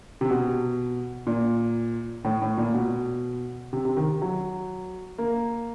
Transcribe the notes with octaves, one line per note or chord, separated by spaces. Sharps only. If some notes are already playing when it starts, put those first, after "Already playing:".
C3
B2
A#2
A2
A2
A#2
B2
C3
C3
D#3
F#3
A#3